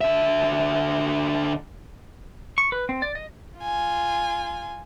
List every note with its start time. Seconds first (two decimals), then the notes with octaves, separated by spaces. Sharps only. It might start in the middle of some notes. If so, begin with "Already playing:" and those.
0.01 D3 E5
2.58 C#6
2.72 B4
2.89 C4
3.02 D5
3.15 D#5
3.59 F4 G#5